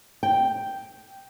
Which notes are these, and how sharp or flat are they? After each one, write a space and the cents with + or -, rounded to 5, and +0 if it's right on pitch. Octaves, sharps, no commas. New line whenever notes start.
G5 -5